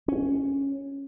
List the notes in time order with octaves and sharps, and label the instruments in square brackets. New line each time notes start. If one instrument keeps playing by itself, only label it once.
[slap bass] C#4